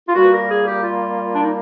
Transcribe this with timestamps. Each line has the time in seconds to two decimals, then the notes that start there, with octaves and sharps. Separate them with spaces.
0.08 F4
0.14 A#2 G3 A#3 F#4
0.23 B4
0.32 A#4
0.49 G#4
0.66 G4
0.83 F4
1.34 D4
1.43 D#4